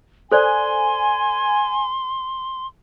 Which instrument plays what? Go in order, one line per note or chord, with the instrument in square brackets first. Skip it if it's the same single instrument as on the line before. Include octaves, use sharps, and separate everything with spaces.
[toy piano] A4 C5 D5 [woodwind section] G#5 [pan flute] C6